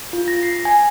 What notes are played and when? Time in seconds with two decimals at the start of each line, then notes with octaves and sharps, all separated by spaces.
0.13 F4
0.28 A#6
0.43 C7
0.65 G#5